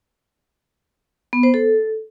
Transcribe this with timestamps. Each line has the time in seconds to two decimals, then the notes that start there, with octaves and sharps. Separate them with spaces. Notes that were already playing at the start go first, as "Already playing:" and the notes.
1.33 B3
1.43 C5
1.54 A4